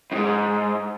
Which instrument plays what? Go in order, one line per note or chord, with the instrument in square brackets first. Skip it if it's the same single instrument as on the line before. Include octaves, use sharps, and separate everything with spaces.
[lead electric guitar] F2 G#2